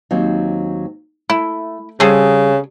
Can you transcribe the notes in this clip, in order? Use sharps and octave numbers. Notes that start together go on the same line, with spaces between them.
D#2 F#3 C4
A3 E4
C#3 G3 C4 G#4 A4